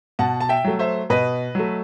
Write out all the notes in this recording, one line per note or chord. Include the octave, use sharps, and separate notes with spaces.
B2 F#5 A5
A5
E5 G5
F#3 A3
C5 E5
B2 B4 D#5
F#3 A3